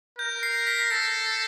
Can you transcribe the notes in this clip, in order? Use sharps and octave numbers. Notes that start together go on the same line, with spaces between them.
A#4 G6
C7
B6
A4 A#6